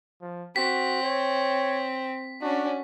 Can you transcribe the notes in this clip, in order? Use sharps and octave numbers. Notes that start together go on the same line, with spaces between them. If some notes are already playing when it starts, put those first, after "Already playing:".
F3
C4 F#4 B6
C#5
C#4 D4 F#4